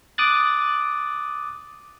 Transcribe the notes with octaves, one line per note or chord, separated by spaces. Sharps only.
D6 D#6 F#6 A6